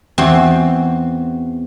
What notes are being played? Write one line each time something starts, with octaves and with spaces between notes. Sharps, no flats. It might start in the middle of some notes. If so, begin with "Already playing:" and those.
E2 C4 F#4 C6